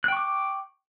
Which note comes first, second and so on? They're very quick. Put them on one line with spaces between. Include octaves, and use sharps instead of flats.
F#6 G5 C#6 D6